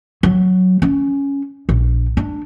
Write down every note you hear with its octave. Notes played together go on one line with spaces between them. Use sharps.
F#3
C#4
A#1
D4